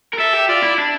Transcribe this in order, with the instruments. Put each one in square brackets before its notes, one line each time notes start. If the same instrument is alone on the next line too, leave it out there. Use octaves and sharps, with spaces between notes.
[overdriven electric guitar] A#4
[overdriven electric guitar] A4 [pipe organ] E5
[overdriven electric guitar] G4
[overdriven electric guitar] F4 [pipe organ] D5
[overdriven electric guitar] E4
D4